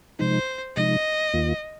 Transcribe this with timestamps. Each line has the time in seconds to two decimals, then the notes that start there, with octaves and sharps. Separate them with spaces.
0.19 C3 F3 G#3 D#4 C5
0.76 C3 F3 G#3 D#4 D#5
1.33 D#2 D#3 A#3 F4